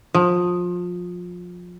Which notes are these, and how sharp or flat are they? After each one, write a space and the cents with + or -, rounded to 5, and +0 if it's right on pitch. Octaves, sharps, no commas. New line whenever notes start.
F3 +25